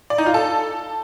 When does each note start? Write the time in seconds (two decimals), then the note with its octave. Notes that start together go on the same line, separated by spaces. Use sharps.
0.10 D5
0.18 D#4
0.26 F4
0.34 A4